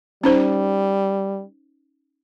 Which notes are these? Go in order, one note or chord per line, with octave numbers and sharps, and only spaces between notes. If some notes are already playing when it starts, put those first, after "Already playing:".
G3 C#4 D#4 C5